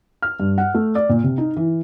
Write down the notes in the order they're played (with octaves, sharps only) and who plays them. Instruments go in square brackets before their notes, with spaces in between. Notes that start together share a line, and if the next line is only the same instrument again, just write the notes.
[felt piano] F6
G2
F#5
A3
D5
A#2
C3
D#4
E3